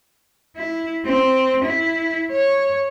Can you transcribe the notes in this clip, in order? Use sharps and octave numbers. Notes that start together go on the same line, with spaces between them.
E4
C4
E4
C#5